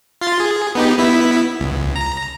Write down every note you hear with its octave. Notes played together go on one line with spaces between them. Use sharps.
F4 C6 A6
G#4
B3 D#4 G4
B3 E4 B6
C#2
A#5